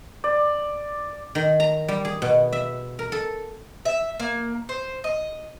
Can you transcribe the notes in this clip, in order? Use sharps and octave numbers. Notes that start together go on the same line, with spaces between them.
D5
D#3
A#5
G3
G#4
B2
E5
A#4
A4
E5
A#3
C5
D#5